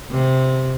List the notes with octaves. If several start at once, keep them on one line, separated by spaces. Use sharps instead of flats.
C3